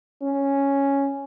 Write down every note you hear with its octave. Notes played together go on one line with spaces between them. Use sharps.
C#4